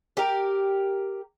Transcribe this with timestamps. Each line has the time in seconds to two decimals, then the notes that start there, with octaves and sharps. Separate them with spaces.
0.17 G4 A#4